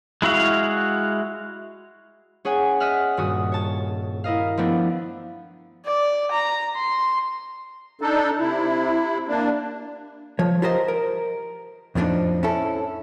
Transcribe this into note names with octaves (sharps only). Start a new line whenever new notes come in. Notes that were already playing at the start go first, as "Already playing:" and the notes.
G#3 E4 F#4 F5
C#4 G#4 C#5 F#5 G#5
D#5 E5 F#5 F6
D#1 G2 F#4 D#6
C#5 A5
E4 A#4 D#5 F5
F3 A3 B3 D4 E4
D5
A#5
C6
D4 D#4 A4
C3 E4
A#3 D4
F3 C#5
F4 G4 A#4 C5 D#5
A#4
F2 A2 F3 C4 D4 D#4
C#4 E4 A4